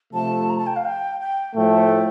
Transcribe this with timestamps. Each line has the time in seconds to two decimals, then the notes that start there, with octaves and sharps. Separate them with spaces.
0.12 C3 F3 A3 A5
0.49 A#5
0.57 A5
0.66 G5
0.75 F5
0.84 G5
1.20 G5
1.55 A2 F3 A3 G5